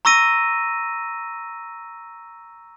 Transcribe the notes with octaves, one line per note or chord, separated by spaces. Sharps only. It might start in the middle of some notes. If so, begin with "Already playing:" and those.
A#5 C#6 E6 A#6 D#7